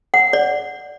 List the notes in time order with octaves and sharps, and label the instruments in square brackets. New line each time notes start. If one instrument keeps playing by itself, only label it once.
[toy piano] F#5
D5